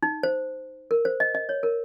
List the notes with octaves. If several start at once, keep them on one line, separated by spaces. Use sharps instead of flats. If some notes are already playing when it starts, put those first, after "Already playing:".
D#4
C5
A#4
C5
D#5
D#5
C#5
A#4